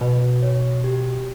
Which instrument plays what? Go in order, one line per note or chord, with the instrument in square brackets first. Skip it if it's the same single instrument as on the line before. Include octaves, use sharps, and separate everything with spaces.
[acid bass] B2 [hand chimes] B4
[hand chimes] C#5
G4